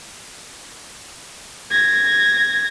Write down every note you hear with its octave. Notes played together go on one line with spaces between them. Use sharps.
G#6 A#6